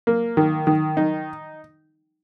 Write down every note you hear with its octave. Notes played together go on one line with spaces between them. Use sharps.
A#3
D#3
D#3
D#4